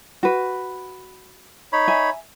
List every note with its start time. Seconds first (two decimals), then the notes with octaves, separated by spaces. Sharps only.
0.23 F#4 B4
1.73 D#4 C#5 B5
1.88 E5 G#5